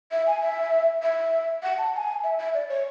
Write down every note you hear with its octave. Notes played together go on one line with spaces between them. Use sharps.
E5
G#5
E5
E5
F#5
A5
A5
G#5
E5
E5
D5
C#5